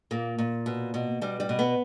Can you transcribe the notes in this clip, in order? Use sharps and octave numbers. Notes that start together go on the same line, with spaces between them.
A#2 A#3
A#2
B2
B2
B2 G3
G3
B2
B3